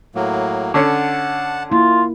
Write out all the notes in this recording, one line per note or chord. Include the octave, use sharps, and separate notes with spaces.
A2 F#3 A#3
D3 C#4 F#5 A5
A#3 E4 F4